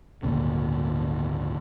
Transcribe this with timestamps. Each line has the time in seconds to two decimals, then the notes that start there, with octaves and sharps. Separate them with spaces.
0.23 G#1 D2 A#2 C#3